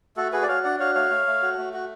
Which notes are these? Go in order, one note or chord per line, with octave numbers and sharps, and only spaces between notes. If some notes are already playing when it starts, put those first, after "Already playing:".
A3 F#4 A4
F#4 G#4 B4
D5
F#4 C#5 F5
D4 D5 F#5
F#4 C#5 F5
A3 C#5 F5
A3
A3
F#4
A3
F#4